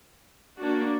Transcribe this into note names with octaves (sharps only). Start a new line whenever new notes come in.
A#3 D4 F#4